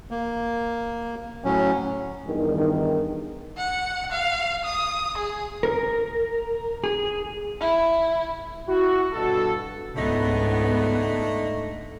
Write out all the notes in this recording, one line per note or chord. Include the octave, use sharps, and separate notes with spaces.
A#3
A2 F#3 C#4
E2 G2 D#3
F#5
F5
D#6
G#4
A#4
G#4
E4
E4 F#4
G2 B2 F#4 A4
C#2 G#2 D3 A3 B3 D#4